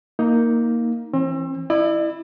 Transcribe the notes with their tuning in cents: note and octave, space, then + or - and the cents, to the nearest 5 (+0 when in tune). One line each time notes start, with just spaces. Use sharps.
A#3 +0 D#4 +15
E3 +0 C4 +40
E4 +0 D5 +45